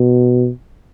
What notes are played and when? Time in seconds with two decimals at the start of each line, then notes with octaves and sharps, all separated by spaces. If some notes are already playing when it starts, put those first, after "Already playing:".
Already playing: B2